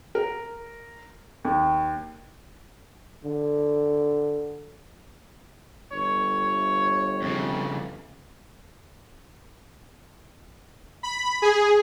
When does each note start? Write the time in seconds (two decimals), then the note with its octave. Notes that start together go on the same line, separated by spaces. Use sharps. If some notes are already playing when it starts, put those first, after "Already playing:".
0.15 A#4
1.45 D#2
3.24 D3
5.92 G1 C#5
7.22 F2 C#3
11.03 B5
11.42 G#4